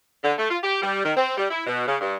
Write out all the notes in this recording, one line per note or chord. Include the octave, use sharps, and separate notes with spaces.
D3
A3
F4
G4
G3
D#3
C4
G3
E4
B2
C#3
G2